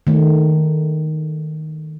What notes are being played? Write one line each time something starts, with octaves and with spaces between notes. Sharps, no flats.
D#3 A3